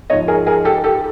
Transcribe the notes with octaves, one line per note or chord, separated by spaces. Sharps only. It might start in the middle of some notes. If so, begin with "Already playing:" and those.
G#2 F3 C#5 D#5
G#4 A#4
G#4 A#4
G4 A4
G4 A4